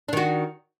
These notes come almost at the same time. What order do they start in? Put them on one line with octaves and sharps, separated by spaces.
D4 D#3 F#4